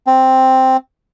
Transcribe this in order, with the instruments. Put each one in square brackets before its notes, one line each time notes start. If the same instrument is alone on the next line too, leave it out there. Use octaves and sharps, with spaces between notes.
[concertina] C4